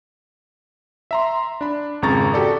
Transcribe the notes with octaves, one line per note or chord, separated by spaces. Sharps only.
E5 A#5 C6
D4 B5
G#1 F2 C#3 A#5 C#6 A6
F#4 G4 A4 D5